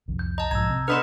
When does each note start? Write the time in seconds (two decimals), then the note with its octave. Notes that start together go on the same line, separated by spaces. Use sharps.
0.08 C2 F2
0.19 G6
0.38 D#5 A5 A#5
0.51 B1 G#2 F3 A#5 E6 G#6
0.70 C3
0.88 D3 B3 B4 D#5 C6 F6 E7